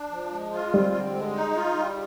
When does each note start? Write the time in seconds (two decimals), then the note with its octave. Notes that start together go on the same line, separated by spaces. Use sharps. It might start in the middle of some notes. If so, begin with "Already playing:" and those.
Already playing: D4
0.11 F3
0.32 G#3
0.53 F4
0.73 G3 C4
0.94 D3
1.15 G#3
1.35 D#4
1.56 F4
1.78 G3